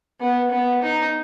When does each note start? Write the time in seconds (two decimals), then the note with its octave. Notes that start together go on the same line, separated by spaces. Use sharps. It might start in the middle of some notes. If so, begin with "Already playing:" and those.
0.20 B3
0.51 B3
0.82 D#4